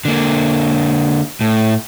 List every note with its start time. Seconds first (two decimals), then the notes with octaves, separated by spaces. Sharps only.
0.05 D3 A#3
1.41 A2